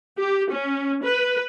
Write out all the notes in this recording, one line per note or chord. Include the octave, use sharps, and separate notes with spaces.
G4
C#4
B4